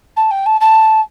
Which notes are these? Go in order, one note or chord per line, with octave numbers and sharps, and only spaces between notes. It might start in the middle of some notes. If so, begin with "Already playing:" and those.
A5
G5
A5
A5